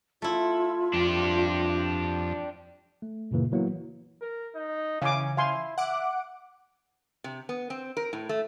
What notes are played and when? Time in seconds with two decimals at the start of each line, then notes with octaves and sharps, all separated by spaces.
0.22 A3 E4 F4
0.93 F2 D4 G4
3.02 A3
3.31 F#2 A#2 C#3 E3 A#3
3.52 E3 F#3 A#3 B3 E4
4.21 A#4
4.55 D#4
5.02 C#3 E3 C#4 F5 G#5 D6
5.37 E4 F5 G#5 C6
5.78 E5 F#5 D6
7.24 C3
7.49 B3
7.70 C4
7.97 A#4
8.13 A2
8.29 A3